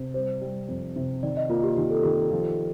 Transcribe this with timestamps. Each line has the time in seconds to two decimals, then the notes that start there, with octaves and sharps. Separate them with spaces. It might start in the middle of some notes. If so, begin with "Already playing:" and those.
Already playing: C3
0.14 G3 C5
0.41 G3
0.69 F2
0.96 C3
1.23 D#3 D5
1.37 D#5
1.49 A#3 F4
1.63 G4
1.77 D#3 G4
1.91 A4
2.03 D#3 G4
2.31 F3